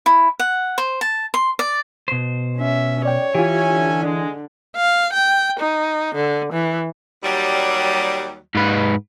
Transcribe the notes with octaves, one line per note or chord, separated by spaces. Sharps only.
E4
F#5
C5
A5
C6
D5
B2 C5
C#4 E5
C#5 D5 G5
E3 C#4 F4 G4 E5 G#5
D3
G#3 D4
F5
G5
D#4
D3
E3
D#2 F#3 G3
G#2 B4